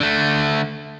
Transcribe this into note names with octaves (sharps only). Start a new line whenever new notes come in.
D3 A3